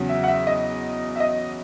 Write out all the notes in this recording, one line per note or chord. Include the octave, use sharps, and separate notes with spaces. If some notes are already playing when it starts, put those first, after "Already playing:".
Already playing: E2 C#3 F#3
E5
F#5
E5
D#5
E5
D#5